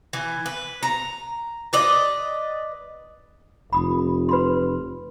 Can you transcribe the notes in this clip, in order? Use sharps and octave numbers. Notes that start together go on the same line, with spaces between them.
E3
B4
A#5
B4 D5 D#5
F1 B5 D#6
B4 B5 C6